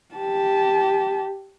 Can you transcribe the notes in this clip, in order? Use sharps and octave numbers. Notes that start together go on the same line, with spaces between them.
G4 A5